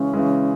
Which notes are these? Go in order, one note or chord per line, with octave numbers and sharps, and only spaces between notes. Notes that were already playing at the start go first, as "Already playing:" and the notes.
Already playing: C#3 E3 G#3 C#4
C#3 E3 G#3